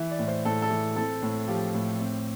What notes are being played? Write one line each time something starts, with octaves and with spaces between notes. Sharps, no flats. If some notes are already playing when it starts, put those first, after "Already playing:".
Already playing: E3 E5
D5
A2
C5
A2 A4
A4
E3
C4 A4
A2
F3 G4
A2
C4